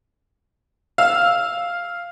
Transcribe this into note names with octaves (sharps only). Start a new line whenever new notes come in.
F5 E6